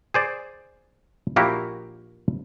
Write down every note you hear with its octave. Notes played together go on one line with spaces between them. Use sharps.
G#4 C5 D5
A#1 A#2 A#3 E4 F#4 G4